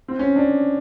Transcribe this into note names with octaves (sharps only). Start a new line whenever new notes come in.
C4
C#4
D4